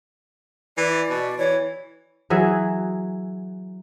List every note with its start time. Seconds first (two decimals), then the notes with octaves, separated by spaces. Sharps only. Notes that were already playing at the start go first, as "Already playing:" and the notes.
0.77 E3 D5
1.10 B2
1.38 E3 C#5
2.30 E3 F#3 G#4 E5